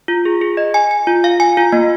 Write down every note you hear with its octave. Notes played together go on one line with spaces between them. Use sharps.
F4
G#4
G#4
D#5
G#5
G#5
F4
F5
G#5
F4
A#3